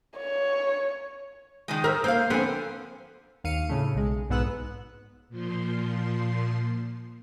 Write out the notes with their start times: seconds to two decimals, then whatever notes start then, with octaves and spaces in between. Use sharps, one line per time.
0.17 C#5
1.68 D#3 F3 G#3
1.84 A#4 E5
2.04 A#3 C5 F5
2.30 D3 F3 B3 C4 G#5
3.44 D#2 F5 C#7 D#7
3.69 A2 C#3 A3
3.95 B1 G#3
4.30 B1 G#2 B3 E6 F#6
5.29 A#2 F3 C6